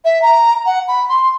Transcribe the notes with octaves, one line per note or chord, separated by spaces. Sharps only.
E5
A#5
F#5
B5
C6